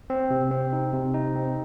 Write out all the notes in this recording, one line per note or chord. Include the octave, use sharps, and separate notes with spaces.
C4
C3
C4
D#4
C3
D#4
C4